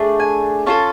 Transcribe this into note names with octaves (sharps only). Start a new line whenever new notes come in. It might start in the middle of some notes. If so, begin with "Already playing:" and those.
Already playing: A3 D4 G#4
G#5
C#4 F4 A4 A5